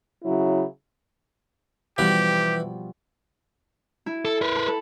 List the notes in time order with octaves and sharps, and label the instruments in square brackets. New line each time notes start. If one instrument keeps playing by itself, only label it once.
[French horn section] C#3 F#3 E4
[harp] B2 F3 G3 [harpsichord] E3 [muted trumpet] G4
[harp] E4
[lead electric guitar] A4
A#4 B4
[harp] B5
A4